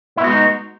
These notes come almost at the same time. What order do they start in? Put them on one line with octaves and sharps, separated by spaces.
E4 B3 F#4 G#3 D#4